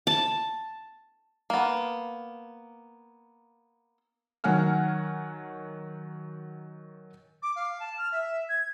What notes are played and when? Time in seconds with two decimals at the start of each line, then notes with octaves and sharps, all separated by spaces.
0.07 A5
1.50 A#3 B3
4.44 D#3 F#3 F#5 G#5 F6
7.42 D6
7.56 F5
7.80 A5
7.98 F6
8.12 E5
8.49 G#6